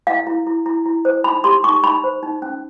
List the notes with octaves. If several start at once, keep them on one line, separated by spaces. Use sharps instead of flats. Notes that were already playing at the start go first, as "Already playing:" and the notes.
E4 F5
E4
E4
E4
E4
C5
D#4 B5
G4 C6
D#4 C#6
D#4 B5
C5
D#4
C#4